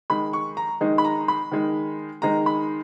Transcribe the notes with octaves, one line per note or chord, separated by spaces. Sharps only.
D#3 G#3 D#4 B5
C#6
A#5
D#3 G#3 D#4
B5
A#5
B5
D#3 G#3 D#4
D#3 G#3 D#4 A#5
B5